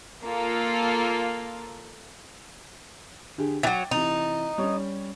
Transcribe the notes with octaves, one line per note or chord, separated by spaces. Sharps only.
A#3 F4 A4
D3 G4 G#4
E3 F#3 G5 D6 A6
C3 E3 D#4
G3 C#4 C#5